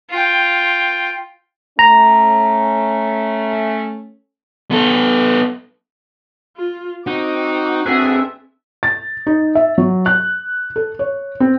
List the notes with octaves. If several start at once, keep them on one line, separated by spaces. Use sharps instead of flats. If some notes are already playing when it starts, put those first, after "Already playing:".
F4 G5
A3 C#4 A#5
B3 A4
F4
C4 D#4 F#4 D6
C4 D4 G#4 A4 B4 E5
A6
D#4
E5
F#3
F#6
A4
C#5
C4